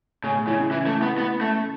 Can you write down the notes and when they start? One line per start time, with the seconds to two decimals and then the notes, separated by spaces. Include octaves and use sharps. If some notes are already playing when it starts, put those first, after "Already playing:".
0.24 A2 C#3 A3
0.35 B2 B3
0.47 C#3 E3 E4
0.59 C#3 C#4
0.71 E3
0.86 A3
1.02 B3
1.18 B3
1.41 A3